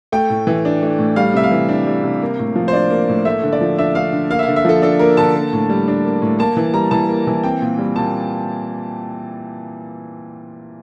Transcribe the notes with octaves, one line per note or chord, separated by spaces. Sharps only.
A3 G5
A2
E3
D4
A3
A2
G3 F5
C3 E5
F5
E3
D4
G3
C3
A#3
A2
F3
C5
D4 D5
A#3
A2
A3 E5
D3
D5
F3
D4 E5
A3 F5
D3
A#3 F5
E5
F5
D3
E5
F3 A4
D4 A4
A#3 A#4
D3 A5
A#3
A2
G3
D4
A#3
A2
A#3 A5
E3
G3 A#5
E3 A5
A#3
E3
C4 G5
A#2
G3
A#2 A5